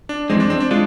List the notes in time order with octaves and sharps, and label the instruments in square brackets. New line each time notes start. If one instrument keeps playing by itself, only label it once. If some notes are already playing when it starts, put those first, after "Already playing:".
[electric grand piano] D4
[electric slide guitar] F2 E3 G#3 [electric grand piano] C4
[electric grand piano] D4
C4
D4
[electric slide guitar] G#3 F4 [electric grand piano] D4